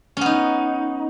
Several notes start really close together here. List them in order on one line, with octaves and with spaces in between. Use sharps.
C#4 B3 D#4